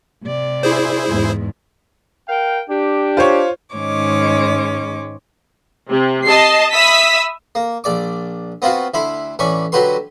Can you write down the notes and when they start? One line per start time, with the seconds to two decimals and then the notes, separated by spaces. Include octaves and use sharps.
0.24 C3 D5
0.63 E4 G#4 C5
1.08 E2 G#2
2.29 A#4 F5 G5
2.70 D4 G4
3.17 F4 C5 C#5
3.75 G#2 D#3 G#3 C#4 C#5 D6
5.90 C3
6.26 D#5 A5 C7
6.72 E5 B5 D#6 E6 B6
7.55 A#3
7.84 A#1 D5 D6
8.62 B3 C4 F4 F#4 F5
8.94 D2 E4 C5 B5
9.39 A1 C#4 D4 B5 C#6
9.72 D3 F#3 F#4 G4 B4 C6